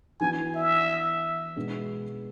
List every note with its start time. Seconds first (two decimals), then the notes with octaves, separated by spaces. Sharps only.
0.20 E3 B3 D4 F#4 G#5
0.55 E5
1.56 B2 G#3 B3 D4